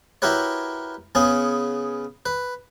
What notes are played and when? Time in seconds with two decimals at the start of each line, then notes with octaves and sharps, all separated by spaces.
0.22 E4 F#4 G4 A#4 B4 C#5
1.15 C#3 B3 C#4 G#4
2.26 B4